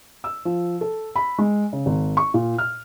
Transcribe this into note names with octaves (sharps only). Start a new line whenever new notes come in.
E6
F3
A4
B5
G#3
C#3
G#1
C#6
A#2
F6